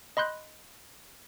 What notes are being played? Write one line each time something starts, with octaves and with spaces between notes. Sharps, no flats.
D#5 B5 C6 F#6 G6